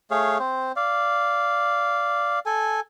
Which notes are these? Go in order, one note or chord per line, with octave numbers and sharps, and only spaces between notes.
A3 G#4 C#5 F5
C4 C5
D5 F5
A4 G#5